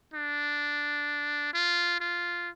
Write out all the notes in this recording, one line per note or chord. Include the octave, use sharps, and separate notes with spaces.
D4
F4
F4